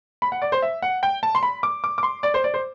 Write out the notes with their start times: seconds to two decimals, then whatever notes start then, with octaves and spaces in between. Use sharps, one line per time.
0.22 B5
0.32 F#5
0.42 D5
0.52 C5
0.62 E5
0.82 F#5
1.03 G5
1.23 A5
1.35 C6
1.43 B5
1.63 D6
1.84 D6
1.98 D6
2.03 C6
2.23 D5
2.34 C5
2.44 D5
2.54 C5